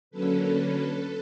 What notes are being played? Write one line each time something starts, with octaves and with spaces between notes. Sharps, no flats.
D3 F#3 A#3 C#4 A4 B4